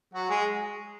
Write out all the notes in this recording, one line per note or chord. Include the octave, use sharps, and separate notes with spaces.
F#3 F#4
G#3 G#4